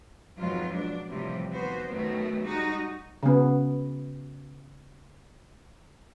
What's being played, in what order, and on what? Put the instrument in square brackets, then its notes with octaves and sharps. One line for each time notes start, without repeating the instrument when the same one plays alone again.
[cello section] F2 G#2 B2 F#3 F4
D4
A2 C3 E3 F3 G3
D#2 B3 F#4 C5
F#2 B2 D#3 A3
G3 G#3 D#4 F#4
[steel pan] C#3 B3